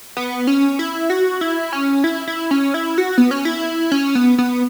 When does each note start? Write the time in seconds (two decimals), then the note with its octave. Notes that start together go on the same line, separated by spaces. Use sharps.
0.17 B3
0.47 C#4
0.79 E4
1.10 F#4
1.41 E4
1.73 C#4
2.04 E4
2.27 E4
2.51 C#4
2.74 E4
2.98 F#4
3.18 B3
3.31 C#4
3.45 E4
3.92 C#4
4.15 B3
4.38 B3